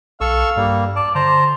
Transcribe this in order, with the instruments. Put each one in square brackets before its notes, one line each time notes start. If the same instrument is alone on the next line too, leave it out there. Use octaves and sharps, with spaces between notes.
[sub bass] B1 [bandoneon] A4 C#6 E6 [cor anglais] F5
[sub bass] G2 [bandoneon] G3 A#3
[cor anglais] D5 [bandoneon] A5
[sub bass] D3 [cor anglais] C5 [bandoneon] A5 A#5